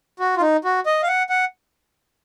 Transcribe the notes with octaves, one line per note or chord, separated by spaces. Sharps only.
F#4
F4
D#4
F#4
D#5
F5
F#5
F#5